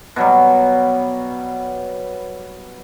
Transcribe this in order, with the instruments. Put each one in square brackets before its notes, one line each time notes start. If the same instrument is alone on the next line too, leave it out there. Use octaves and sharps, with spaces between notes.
[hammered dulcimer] B2 F#3 G3